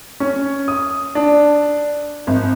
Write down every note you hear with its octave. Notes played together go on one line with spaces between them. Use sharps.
C#4
D#6
D4
G#1